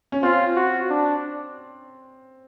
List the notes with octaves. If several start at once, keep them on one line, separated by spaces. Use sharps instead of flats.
C#4
C4 F4
F#4
D4